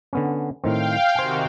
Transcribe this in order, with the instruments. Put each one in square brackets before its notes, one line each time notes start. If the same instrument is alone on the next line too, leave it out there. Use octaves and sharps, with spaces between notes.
[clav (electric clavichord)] D3 B3 C#4
[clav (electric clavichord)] A2 D#3 C4 [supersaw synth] F5 G5
[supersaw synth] C3 D#3 F#4 [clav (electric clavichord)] C5 G5 G#5